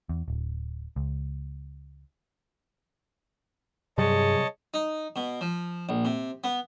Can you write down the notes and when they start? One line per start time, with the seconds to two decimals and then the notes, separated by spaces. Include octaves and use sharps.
0.09 E2
0.28 D1
0.96 C#2
3.98 G2 C3 F#3 G3 G#4 C#5 D#5 A5
4.74 D#4
5.16 B2
5.41 F3
5.89 A#1
6.05 C3
6.44 B3